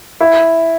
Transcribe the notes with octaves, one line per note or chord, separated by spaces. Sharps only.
E4